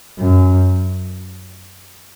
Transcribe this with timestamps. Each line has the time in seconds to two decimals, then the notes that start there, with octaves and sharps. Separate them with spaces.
0.18 F#2